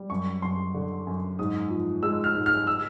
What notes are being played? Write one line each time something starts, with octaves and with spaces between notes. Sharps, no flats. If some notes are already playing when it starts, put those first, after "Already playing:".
Already playing: G3
F#2 C#6
F#2 C6
D3
F#2
G#2 D#6
F3
G#3 E6
F6
G#2
F6
E6